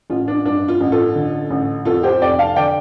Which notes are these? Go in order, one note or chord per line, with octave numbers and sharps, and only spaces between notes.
A1 F4
D4
G2 D4
F4
A1
F4 A4
D3
A1
F2 F4 A4
G4 C5
F1 D5 G5
F5 A5
D3 D5 G5